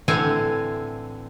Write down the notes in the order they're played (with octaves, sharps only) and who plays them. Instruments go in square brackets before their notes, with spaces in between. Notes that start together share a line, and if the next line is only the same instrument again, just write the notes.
[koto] A2 D3 E3 C4 G#5